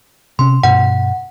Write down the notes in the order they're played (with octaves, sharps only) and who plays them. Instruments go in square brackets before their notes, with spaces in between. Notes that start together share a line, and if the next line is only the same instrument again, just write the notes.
[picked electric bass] C3 C#4 [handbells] C6
[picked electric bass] G2 B2 [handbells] F#5